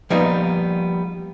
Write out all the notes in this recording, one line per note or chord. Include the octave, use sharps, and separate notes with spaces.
F3 G3 A#3 B3 D#4